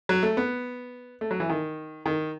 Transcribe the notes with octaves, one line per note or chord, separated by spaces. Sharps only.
F#3
A3
B3
A3
F#3
E3
D#3
D#3